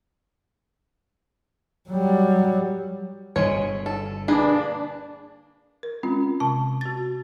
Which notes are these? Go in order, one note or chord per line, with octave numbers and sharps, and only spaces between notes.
F#3 G3
G1 B2 D3 G#3 C#5
A4
A#3 D4 G#4 B4
A#4
G#3 C4 C#4 F4
C3 A5
F#4 A6